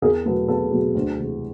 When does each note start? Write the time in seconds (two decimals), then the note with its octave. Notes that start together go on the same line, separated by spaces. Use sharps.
0.02 E2 G#4 A#4
0.25 B2 F#3 A3 A4 B4
0.48 E2 A4 B4
0.71 B2 F#3 A3
0.95 D2
1.18 C3 E3 G#3